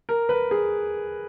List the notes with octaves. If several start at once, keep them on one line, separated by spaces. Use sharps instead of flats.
A#4
B4
G#4